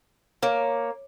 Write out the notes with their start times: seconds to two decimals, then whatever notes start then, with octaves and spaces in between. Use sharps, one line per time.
0.43 A#3 C#5